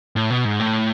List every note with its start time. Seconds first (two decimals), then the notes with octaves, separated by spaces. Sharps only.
0.16 A2
0.30 B2
0.45 G#2
0.59 A2